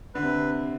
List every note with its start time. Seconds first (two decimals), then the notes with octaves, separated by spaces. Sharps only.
0.15 D3 B4
0.22 C3